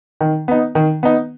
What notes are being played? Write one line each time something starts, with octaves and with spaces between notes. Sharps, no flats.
D#3
B3 D#4
D#3
B3 D#4